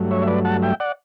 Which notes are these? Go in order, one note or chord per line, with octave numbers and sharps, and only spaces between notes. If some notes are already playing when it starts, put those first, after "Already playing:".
Already playing: G2 F#3 A3
C#5 E5
E5
B4 D5
F#5 A5
E5 G5
D5 F#5